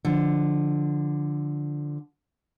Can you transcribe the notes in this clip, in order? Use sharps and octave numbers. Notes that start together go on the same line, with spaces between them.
D3 F3